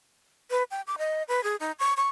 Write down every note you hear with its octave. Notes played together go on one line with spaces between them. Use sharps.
B4
G5
D6
D#5
B4
G#4
D#4
C#6
C#6